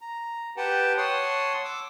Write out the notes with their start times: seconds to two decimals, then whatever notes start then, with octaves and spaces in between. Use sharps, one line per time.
0.01 A#5
0.57 G4 B4 F#5 G5 A5
0.98 C#5 F#5 A5 C6 D#6
1.65 D6 E6